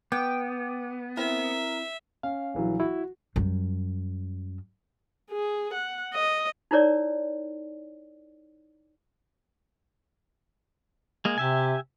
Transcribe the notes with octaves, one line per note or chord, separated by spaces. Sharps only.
B3 G5 D6
C4 E4 A#4 E5
C#4 F5
A#1 E3 F#3
E4 F#4
F#2 G3
G#4
F#5
D#5
D#4 E4 A#4 C#5 D5
G#3 A#3 G#4
C3 G4 E5 G#5